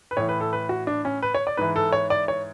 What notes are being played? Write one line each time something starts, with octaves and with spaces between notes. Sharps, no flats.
B4
A2 E3 C#5
B4
A4
B4
F#4
D4
C#4
B4
C#5
D5
G#2 E3 B4
A4
C#5
D5
C#5